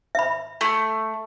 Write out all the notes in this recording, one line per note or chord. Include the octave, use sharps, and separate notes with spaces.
E5 B5
A3